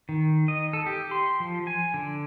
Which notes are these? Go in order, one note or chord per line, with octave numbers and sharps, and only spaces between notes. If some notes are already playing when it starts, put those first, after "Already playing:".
D#3
D#5
A4
G4
C6
F3
G#5
D3